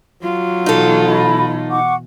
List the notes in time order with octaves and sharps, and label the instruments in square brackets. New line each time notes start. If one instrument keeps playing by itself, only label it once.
[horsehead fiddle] F#3 F4
[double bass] B2 E3 [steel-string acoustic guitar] D#4 A4
[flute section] D#5 B5
F#5 C#6 D6